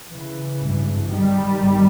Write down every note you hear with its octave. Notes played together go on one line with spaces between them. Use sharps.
C#3 E3
G#1 G2
D#3 G3
G1